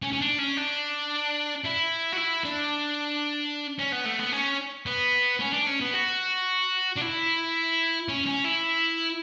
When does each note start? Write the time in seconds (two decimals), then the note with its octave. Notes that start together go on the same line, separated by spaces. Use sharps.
0.02 C#4
0.13 C#4
0.21 D4
0.39 C#4
0.57 D4
1.64 E4
2.13 F#4
2.17 E4
2.45 D4
3.79 C#4
3.93 B3
4.06 A3
4.19 B3
4.33 C#4
4.86 B3
5.40 C#4
5.53 D4
5.67 C#4
5.81 B3
5.94 F#4
6.97 D4
7.02 E4
8.09 C#4
8.26 C#4
8.44 E4